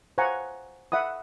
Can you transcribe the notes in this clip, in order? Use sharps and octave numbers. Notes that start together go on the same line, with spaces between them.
C5 F5 F#5 G#5 A#5 C#6
E5 F#5 B5 D#6